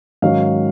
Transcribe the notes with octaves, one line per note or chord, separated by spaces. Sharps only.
G#2 D#3 F#3 C#4 F5